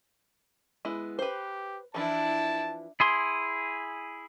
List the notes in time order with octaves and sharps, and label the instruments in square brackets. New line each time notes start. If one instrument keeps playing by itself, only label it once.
[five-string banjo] G#3 B3 E4
[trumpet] G4 [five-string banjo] B4 C5
[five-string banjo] E3 F3 [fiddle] D4 E4 [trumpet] A5
[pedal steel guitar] E4 G#4 C6